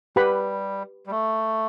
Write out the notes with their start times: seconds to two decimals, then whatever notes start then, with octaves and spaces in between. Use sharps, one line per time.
0.16 G3 G4 B4 F#5 B5
1.06 G3
1.11 A3